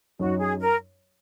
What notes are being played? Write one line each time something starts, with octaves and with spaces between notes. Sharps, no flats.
F#2 F#3 D#4 F#4
G#4
A#4